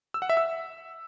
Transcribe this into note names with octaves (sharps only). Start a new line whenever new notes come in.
E6
F#5
E5
E6